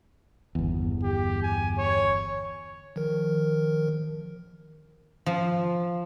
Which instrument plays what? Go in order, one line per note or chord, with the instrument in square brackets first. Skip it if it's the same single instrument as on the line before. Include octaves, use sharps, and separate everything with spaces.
[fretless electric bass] G1 E2
[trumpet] G4
G#5
C#5
[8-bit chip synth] D#3 F3 A#4
[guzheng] F3